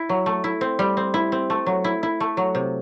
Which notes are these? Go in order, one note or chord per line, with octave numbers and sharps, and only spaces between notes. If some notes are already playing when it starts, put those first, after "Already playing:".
Already playing: E4
F#3
A3
E4
C4
G3
C4
E4
C4
A3
F#3
E4
E4
A3
F#3
C3